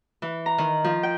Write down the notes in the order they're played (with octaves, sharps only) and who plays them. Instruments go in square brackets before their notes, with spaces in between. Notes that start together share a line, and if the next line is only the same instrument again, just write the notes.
[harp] E3
A#5
D#3
F3
G5